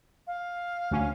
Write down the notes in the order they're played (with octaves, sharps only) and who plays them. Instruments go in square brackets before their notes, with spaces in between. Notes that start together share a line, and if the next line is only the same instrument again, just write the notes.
[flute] F5
[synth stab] D2 C#4